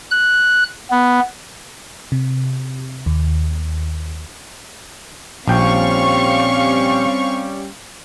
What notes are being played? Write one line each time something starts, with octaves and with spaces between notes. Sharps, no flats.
F#6
B3
C3
D#2
A#1 G3 C4 C#4 F5 G5 C#6